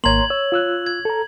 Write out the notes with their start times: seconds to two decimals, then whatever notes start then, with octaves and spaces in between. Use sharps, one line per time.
0.04 G#1 A#3 C#5 A#5 C6 G#6 F#7
0.30 C#5 E6
0.52 F4 E6 F#6
0.86 G#6
1.05 A4 A#5